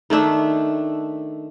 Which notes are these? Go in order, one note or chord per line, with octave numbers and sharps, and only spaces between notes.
D#3 A3 D4 E5